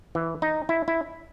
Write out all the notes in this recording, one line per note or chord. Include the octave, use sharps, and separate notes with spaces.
E3
D#4
E4
E4